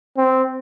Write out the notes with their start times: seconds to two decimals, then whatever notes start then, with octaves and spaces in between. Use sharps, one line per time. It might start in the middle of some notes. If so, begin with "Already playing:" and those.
0.17 C4